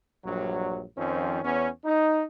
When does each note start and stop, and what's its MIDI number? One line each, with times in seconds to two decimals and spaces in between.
0.25 0.84 34
0.25 0.84 43
0.25 0.84 54
0.97 1.43 41
0.97 1.43 51
0.97 1.43 53
0.97 1.43 61
1.43 1.69 40
1.43 1.69 59
1.43 1.69 61
1.85 2.23 63